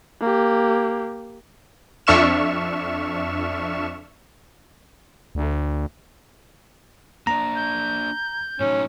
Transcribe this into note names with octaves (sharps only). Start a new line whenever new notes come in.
A#3 G4
F2 D4 E5 C#6 F6 E7
D2
A#3 D4 D5 A#5
G6
A2 F#3 C#4 D#4